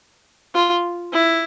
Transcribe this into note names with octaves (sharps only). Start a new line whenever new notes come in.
F4
E4